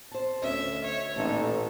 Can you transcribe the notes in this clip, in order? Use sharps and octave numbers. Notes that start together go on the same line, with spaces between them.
C5 A5
D2 C#4 D#5 E5
C#5
A1 A#2 E3 D#4 A4